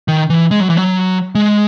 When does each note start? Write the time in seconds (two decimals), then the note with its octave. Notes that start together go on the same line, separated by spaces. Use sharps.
0.08 D#3
0.30 E3
0.51 G#3
0.60 F#3
0.70 E3
0.78 F#3
1.35 G#3